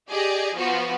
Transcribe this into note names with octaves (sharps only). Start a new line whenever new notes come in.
G4 G#4 D5 D#5
F3 B3 F4 F#4